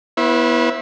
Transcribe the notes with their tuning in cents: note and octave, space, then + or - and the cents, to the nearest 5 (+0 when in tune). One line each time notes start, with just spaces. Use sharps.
B3 -20 E4 +0 C5 +45